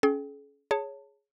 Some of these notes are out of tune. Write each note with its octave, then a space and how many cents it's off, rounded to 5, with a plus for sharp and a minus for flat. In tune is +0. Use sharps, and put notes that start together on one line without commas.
C#4 +15 G#4 +45 G5 +0
G#4 +0 C#5 +0 A5 +20